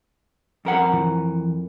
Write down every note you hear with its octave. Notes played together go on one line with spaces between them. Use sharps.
F2 A#4 F#5
E3